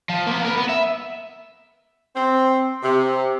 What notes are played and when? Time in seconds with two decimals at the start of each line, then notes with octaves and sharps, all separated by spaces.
0.09 F3
0.27 A#3 B3
0.44 A#4 B4
0.57 B3
0.69 E5
2.16 C4
2.83 C3